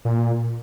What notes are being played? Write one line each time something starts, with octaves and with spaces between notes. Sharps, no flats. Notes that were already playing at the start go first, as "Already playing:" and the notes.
A#2